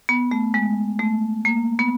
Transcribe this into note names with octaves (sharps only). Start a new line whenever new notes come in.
B3
A3
G#3
A3
A#3
B3